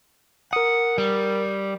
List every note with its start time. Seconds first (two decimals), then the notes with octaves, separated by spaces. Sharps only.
0.53 A#4 F#5 D#6
0.98 G3